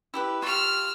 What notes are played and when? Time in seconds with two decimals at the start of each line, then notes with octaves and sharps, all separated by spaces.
0.14 E4 G4 B4
0.42 F4 G4 C#6 E6 F6